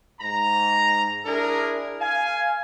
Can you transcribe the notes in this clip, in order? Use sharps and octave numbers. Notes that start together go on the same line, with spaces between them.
G#2 A#5
D4 E4 G#4 A#4
F5 G#5